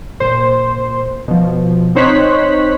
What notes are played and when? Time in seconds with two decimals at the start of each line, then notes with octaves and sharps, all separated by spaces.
0.20 A#2 C5
1.28 B2 F3
1.95 C4 D#4 C5 C#5 F#6 B6